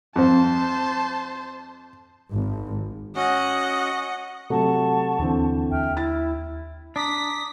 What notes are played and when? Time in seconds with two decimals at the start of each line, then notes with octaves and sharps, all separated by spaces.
0.16 F2 C4 C5 A5
2.32 G#1
3.16 C#4 F#4 D#5 F#5
4.50 C3 F#3 A3 F#5 A5 C#6
5.19 D#2 D3 E3 C4
5.72 D#2 E5 G5 F6
5.97 E4 A6
6.96 D4 A#5 D6 D#6 B6